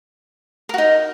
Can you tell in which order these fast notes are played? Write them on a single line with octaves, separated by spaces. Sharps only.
A#4 F#4 D#4